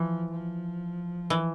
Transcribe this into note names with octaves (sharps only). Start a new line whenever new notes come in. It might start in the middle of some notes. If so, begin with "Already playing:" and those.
Already playing: E3 F3
F3
E3